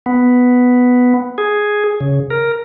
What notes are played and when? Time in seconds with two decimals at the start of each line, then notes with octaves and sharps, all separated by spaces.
0.06 B3
1.38 G#4
2.01 C#3
2.30 A#4